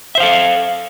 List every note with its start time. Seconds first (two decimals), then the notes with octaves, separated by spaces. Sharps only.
0.15 E5
0.18 C5
0.20 F5
0.23 A4